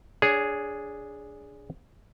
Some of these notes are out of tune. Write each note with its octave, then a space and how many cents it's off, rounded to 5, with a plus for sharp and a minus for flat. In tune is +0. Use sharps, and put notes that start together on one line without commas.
D4 -5 G#4 +0 C#5 +15